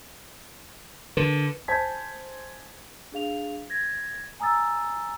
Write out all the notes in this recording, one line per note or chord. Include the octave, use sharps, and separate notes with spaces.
D3 A#4 B4
C5 G#5 A5 G6 G#6 B6
D4 G#4 F5 F7
G#6 A#6
G#5 A#5 D#6 E6 A6